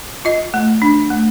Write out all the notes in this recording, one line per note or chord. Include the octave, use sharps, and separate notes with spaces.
F4 D#5
A3
D4
A3